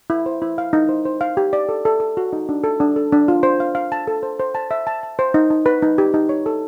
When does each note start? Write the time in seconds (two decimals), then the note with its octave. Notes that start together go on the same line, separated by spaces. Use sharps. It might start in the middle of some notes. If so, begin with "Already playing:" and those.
0.10 E4
0.26 C5
0.42 E4
0.58 F5
0.73 D#4
0.89 C5
1.05 C5
1.21 F5
1.37 G4
1.53 D5
1.69 A4
1.85 A4
2.00 A4
2.17 F#4
2.33 D#4
2.49 D4
2.64 A4
2.80 D4
2.96 A4
3.12 D4
3.28 F4
3.43 C5
3.60 F5
3.75 F5
3.92 A5
4.07 A4
4.23 C5
4.40 C5
4.55 A5
4.71 E5
4.87 A5
5.03 A5
5.19 C5
5.34 D#4
5.50 D#4
5.66 B4
5.82 D#4
5.98 G4
6.14 D#4
6.29 C#5
6.46 A4